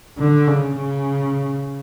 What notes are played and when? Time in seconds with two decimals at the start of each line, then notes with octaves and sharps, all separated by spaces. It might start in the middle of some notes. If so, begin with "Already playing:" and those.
0.18 D3
0.47 C#3
0.77 C#3